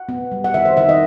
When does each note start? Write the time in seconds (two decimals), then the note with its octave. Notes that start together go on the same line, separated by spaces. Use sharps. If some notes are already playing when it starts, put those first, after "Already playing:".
Already playing: F#5
0.09 B3
0.32 G3
0.44 F#5
0.54 D#3 E5
0.65 C5
0.77 D#3 E5
0.89 D#5